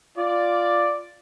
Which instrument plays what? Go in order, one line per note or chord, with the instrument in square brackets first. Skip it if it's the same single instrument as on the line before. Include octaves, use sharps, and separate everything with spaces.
[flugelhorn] F4 [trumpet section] D5